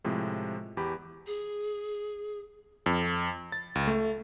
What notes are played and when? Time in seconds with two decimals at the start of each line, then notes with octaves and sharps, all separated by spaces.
0.04 A2 C3 F3 G#3
0.77 E2 G4 B5
1.27 G#4
2.86 F2
3.52 A6
3.75 C#2
3.88 A3